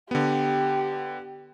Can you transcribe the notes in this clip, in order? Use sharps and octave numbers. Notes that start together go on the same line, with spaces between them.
D3 B3 G4